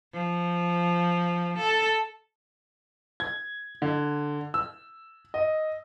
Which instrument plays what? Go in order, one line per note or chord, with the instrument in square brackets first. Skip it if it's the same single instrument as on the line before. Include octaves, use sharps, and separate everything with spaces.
[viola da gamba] F3
A4
[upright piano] G#6
D3
E6
D#5